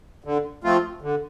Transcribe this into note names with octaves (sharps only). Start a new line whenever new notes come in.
D3
F3 A3 C4 F4
D3